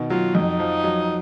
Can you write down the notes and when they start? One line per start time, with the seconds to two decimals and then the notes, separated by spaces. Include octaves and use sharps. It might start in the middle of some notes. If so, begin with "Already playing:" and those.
Already playing: B2 D#3
0.10 F#3 F4
0.35 F2 D#4
0.59 F3
0.84 F#3